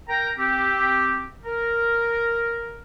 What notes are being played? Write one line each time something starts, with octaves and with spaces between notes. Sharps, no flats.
A#4 G5 A#5
C4 G4
A#4